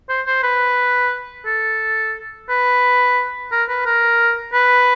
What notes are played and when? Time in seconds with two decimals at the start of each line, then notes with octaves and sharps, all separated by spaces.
0.09 C5
0.27 C5
0.43 B4
1.46 A4
2.50 B4
3.52 A#4
3.69 B4
3.86 A#4
4.54 B4